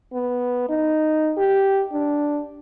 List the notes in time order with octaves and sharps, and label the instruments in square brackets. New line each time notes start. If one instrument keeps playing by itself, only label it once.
[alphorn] B3
D#4
G4
D4